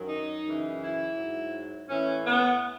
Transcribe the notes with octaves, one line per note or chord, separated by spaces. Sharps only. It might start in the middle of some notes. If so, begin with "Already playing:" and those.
Already playing: F#2 D#3 F#3
D#4
F#2 C#3 E3
E4
G#2 F#3
A2 E3 C#4
B3